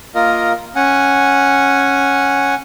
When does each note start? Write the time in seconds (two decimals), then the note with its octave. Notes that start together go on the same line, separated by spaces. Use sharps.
0.15 A#3 F4 A#4 D#5
0.76 C#4 F#5 G#5